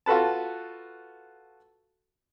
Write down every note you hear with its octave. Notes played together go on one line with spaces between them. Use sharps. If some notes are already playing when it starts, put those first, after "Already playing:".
F4 F#4 A4 B4 A5